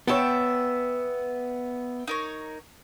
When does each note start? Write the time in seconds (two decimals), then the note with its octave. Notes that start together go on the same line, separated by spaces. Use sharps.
0.07 B3 C#5 E5 G5 A5
2.08 D#4 A#4 C#5